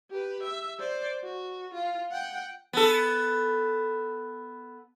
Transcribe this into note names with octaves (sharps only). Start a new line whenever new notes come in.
G4 B4
E5
C5 D5
F#4
F4
F#5 G5
B3 A4